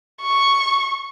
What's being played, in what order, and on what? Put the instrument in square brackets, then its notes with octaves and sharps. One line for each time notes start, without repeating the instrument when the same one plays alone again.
[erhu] C#6